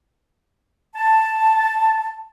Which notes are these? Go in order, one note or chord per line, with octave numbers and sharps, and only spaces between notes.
A5